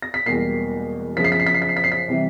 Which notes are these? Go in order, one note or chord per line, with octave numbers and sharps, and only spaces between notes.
A#6
B6
E1 E2 B2 G3 A#3 C7
F#2 C#3 F3 B6
C7
B6
C7
B6
C7
B6
C7
B6
C7
B6
C3 E3 G3